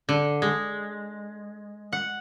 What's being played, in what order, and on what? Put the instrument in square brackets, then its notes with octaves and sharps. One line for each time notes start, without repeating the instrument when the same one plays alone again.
[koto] D3
G#3
F#5